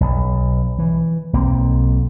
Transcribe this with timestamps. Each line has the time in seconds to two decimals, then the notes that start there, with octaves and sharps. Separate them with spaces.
0.01 B1
0.79 E3
1.33 B1 A#3 C4